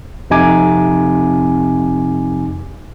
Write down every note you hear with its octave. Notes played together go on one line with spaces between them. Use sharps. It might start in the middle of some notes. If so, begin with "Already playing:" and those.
F2 C3 D#4 G#5 D6